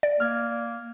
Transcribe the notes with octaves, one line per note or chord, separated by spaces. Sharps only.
D5
A#3 F6 G#6